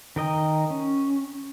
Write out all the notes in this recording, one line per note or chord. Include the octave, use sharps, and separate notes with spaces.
D#3 A#4 D#5 G5
C#4